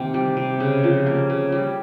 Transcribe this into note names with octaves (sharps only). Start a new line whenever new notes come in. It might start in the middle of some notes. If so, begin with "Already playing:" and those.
Already playing: C3 D#3 A#3 C4
G3
C3
C#3
F3
A#3
C#3
G3